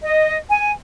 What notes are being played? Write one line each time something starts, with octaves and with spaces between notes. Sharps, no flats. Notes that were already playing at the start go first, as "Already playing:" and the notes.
D#5
G#5